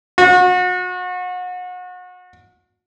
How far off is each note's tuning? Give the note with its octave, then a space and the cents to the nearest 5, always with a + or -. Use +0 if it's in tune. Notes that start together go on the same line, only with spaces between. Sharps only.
F#4 -35